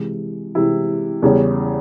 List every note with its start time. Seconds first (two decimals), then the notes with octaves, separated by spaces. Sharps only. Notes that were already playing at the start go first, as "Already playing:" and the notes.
Already playing: C3 E3 G#3 E4
0.55 C3 E3 G#3 E4
1.22 E2 C#3 G3 C#4